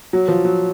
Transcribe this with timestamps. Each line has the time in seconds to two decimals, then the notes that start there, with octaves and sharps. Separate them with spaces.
0.13 F#3
0.28 F3
0.45 F#3